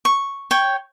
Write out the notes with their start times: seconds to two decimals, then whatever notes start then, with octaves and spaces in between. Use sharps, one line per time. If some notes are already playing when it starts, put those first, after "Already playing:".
0.05 C#6
0.51 C#5 G5